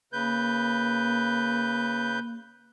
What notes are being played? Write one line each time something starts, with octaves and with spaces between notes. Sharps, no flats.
C#3 A#3 B4 G6